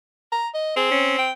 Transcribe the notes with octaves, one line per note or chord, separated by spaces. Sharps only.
A#5
D#5
C4 G#4
C#4
G5